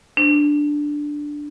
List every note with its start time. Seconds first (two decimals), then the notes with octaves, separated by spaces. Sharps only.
0.17 D4